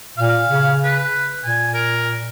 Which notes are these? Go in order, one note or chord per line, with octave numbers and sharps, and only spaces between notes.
A#2 F5
C#3
B4
A#2 G#5
A#4